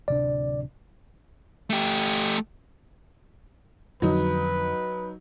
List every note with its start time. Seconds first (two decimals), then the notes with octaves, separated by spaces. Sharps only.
0.08 D1 C3 D4 D5
1.70 A3 G4
4.02 F2 D3 F#3 D#4 B4